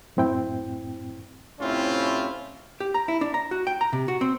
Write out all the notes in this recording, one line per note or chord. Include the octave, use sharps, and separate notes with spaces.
F#2 A2 C4 E4 G5
A2 C3 C4 C#4 E4 F4
G4
A#5
E4
D4
A#5
F#4
G5
A#5
C3
F#4
C4